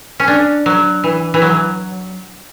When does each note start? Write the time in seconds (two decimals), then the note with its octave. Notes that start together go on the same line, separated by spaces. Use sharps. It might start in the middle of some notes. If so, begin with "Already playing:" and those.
0.20 C#4
0.28 D4
0.66 F#3
1.04 E3
1.34 E3
1.42 F#3